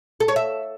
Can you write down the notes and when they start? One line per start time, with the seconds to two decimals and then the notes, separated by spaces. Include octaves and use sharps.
0.20 A4
0.28 C#5
0.36 E5